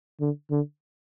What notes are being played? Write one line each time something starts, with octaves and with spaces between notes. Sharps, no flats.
D3
D3